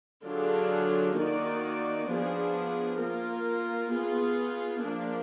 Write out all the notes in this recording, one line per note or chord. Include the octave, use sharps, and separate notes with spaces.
D3 F#3 D4 F4 G#4
D#3 A#3 D#4 F#4 D5
F3 B3 D4 G#4
A#3 F4 A#4
B3 F4 G#4
F3 A#3 D4